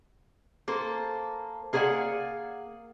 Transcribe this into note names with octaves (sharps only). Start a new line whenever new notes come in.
A#3 A4 C5
A#3 G#4 B4 C#5 D5 F#5